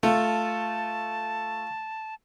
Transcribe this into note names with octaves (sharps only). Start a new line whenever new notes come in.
A3 F4 A5